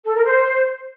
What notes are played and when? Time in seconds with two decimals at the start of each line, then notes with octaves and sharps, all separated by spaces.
0.04 A4
0.14 A#4
0.25 C5